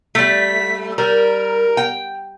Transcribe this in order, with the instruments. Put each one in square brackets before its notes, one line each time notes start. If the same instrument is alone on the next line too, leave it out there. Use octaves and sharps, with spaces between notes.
[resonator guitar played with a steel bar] G3 A3 [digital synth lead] B6
[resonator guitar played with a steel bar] G3 [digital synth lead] A#4
[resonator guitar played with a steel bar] G5